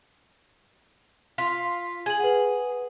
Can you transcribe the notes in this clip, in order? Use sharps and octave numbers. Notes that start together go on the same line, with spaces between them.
F4 B6
G#4 G#6 F#7
B4 F#5